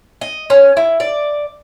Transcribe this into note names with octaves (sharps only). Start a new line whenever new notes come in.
D#5
C#4
E4
D5